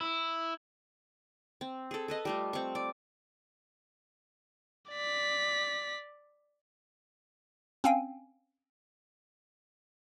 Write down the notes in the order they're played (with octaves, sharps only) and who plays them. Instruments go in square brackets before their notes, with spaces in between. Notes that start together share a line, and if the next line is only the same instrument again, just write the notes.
[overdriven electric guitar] E4
[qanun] C4
G#4 A4
A4 B4 D#5
G3 A3 F4
C4 C#6
D5
[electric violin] D5 B6
[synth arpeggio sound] C4 C#4 F5 G5 G#5